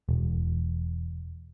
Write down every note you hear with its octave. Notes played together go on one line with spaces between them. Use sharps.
E1